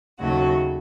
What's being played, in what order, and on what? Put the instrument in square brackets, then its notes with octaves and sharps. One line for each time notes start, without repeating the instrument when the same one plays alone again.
[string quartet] D#2 C#3 F#3 A3 F#4